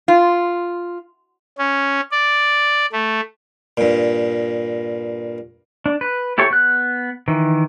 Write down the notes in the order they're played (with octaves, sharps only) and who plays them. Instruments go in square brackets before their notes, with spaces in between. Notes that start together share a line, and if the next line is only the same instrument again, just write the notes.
[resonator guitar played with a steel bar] F4
[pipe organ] C#4
D5
A3
[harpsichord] G2 A#2
[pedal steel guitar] D4
B4
E4 G4 A4 C#5 C#6
B3 F#6
D#3 E3